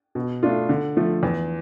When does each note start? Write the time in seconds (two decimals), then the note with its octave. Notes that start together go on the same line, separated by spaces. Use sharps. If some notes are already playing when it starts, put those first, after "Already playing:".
0.15 B2
0.43 A3 D4 F4
0.69 D3
0.97 F3 A3
1.23 E2